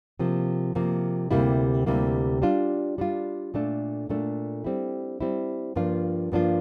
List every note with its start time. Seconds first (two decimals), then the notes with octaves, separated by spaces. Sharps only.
0.19 C3 F3 A#3
0.75 C3 F3 A#3
1.31 D2 C3 G3 A#3 E4
1.86 D2 C3 G3 A#3 E4
2.42 G3 D4 F4
2.98 G3 D4 F4
3.54 A#2 A3 D4
4.09 A#2 A3 D4
4.64 G3 C4 E4
5.21 G3 C4 E4
5.75 G2 F3 A#3 D4 F4
6.32 G2 F3 A#3 D4 F4